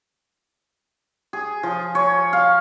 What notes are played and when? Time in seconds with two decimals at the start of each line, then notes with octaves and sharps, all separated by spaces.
1.33 G#4
1.63 F3
1.95 C#5
2.33 F5